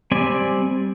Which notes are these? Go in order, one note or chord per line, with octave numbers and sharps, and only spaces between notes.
G3 C4 D5 G#5